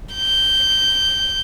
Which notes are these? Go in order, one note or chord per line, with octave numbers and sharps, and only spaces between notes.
G6